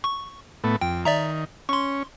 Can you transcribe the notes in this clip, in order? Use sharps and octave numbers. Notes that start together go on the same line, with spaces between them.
C#6
A2 A3 B3
F2 G5
D#3 D5 E5 A#5
C#4 C6 C#6